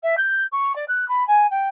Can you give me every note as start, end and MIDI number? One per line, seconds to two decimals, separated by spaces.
0.03 0.15 76
0.17 0.44 91
0.52 0.75 85
0.76 0.85 74
0.88 1.07 90
1.08 1.26 83
1.27 1.47 80
1.51 1.69 79